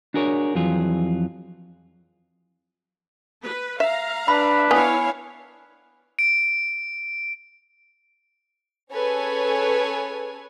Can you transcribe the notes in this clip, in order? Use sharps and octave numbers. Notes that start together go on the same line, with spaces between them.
D4 F#4 G#4 A#4 B4 C#5
F2 E3 F#3 F4 G#4
B4
E5 F5 A#5
D4 B4 B5
B3 E4 C#5 F5 G#5
D7
C#4 G#4 A4 B4 C#5 G#5